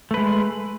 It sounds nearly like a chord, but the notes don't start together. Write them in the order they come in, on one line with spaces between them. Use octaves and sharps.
A3 B4 G#3